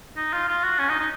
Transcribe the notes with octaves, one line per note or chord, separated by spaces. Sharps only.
D#4
F4
F4
F#4
C#4
D#4
D#4